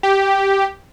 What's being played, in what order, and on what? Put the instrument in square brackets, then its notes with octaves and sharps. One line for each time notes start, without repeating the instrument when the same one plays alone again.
[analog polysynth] G4